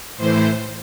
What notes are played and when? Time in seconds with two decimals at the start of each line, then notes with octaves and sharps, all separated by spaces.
0.17 A2 E3 C5